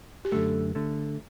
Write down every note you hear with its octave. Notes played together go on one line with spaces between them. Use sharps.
G4
F#2 D3 A3 A4
D3 A3